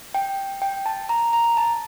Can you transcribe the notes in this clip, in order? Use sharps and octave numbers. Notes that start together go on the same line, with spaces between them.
G5
G5
A5
A#5
A#5
A5